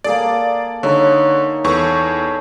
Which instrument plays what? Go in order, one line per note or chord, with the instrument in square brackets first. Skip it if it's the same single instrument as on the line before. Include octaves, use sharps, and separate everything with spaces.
[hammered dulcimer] A#3 G#4 A4 [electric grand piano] D5
[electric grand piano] D3 [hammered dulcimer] D#4 G#4 C#5
[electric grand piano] E2 C#6 [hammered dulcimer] A4 B4